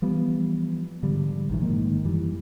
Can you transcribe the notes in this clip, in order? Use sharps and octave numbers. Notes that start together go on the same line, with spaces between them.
E3 F3 G3 B3
G#2 D3 F3 G3
A#1 D#3 E3
G#2 D#3 A#3
F#2 E3 G3